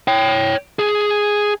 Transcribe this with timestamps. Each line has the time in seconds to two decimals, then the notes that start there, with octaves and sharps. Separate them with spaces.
0.08 C#5 G5
0.79 G#4